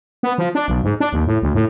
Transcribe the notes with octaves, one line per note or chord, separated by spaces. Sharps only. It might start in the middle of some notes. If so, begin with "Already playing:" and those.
B3
F3
D4
B1
G#2
D4
D#2
A2
D2
A2